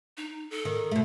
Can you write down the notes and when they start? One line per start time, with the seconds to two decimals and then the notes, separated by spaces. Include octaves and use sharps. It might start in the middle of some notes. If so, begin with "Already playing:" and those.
0.17 D#4
0.51 A4
0.65 D#3
0.91 B2 A3